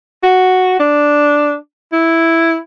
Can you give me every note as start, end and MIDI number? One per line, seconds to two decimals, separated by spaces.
0.23 0.80 66
0.80 1.55 62
1.93 2.57 64